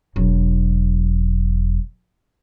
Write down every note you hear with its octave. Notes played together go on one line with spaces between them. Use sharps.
E1 F#3